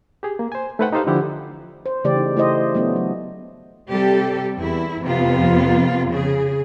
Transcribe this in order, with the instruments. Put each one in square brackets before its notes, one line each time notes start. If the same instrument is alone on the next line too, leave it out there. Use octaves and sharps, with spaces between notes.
[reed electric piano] G4 G#4
A#3
C5 G#5
A3 D#4 B4 C5 F#5 G5
D#4 G4 A4 C5 D#5 F5
D3 F3 E4 G4 F#5
[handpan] C5
C#3 E3 A3 G4 D5
D#4
A3 E4 C5 D#5
F#3 A3 B3 D4
F#3
[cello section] C3 G3 G4 A4
E2 E4
F2 C3 B3 F4
C#3 G#4